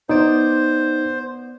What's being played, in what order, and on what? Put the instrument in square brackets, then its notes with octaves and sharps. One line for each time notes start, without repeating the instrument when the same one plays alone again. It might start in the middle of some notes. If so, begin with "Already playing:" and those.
[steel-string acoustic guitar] B3 D5 [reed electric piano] D#4 [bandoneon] C5